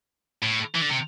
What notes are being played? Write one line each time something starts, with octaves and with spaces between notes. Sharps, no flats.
A2
E3
D3
C3